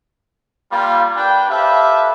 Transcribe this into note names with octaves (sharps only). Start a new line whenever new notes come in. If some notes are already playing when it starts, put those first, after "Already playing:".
G3 A#3 F4
D4 G4 B4 G5
G4 A4 B4 C5 E5 F5